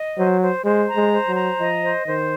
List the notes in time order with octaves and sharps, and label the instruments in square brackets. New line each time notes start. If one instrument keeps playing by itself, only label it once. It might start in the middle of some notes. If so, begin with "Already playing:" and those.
Already playing: [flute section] D#5
[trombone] F#3 [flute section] C5
[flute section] C5
[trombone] G#3 [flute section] C5
[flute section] A#5
[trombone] G#3
[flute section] C5
[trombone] F#3
[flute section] A#5
[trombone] F3 [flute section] D#5
[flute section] C5
[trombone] D#3 [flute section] C5